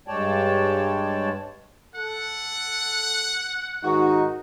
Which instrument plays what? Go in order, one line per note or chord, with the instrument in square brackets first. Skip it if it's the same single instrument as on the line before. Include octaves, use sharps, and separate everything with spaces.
[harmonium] G2 G#3 C#5 D5 G5 A5
[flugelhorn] A4 [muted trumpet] F#5
[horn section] G#2 D#3 F#4 [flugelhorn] D#4